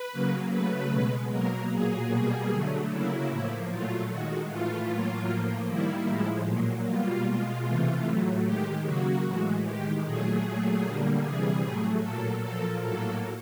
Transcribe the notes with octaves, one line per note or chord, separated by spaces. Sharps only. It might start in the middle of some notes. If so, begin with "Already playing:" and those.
Already playing: B4
C#3 F#3 A#3
C#3 F#3 A3 B4
B2 G#3
B2 F#3 A#3 A#4
A#2 F#3 A#3 G#4
B2 G3 A#3
D3 F#3 A3
C#3 F#3 A#3 E4
A2 F3 A#3
A#2 F#3 A3 F4
D#3 G#3 F#4
A2 E3 A3 F4
A2 F#3 A#3
A2 F3 A#3
D#3 G3 A#3 E4
A2 F3 G#3
A#2 F#3 A#3
B2 G3 A#3 F4
B2 G#3
C3 E3 A3
A2 F#3 A3
D#3 G#3 G4
C#3 F#3 A#3 F#4
A2 E3 G#3
D#3 G#3 G4
A#2 F#3 A3 G#4
A#2 F#3 A3
D3 G3 A#3
C3 E3 G3 G#4
A2 F#3 A3
A#2 F#3 A#3 A4
A#2 F3 A#3 A4
A2 F#3 A#3 A4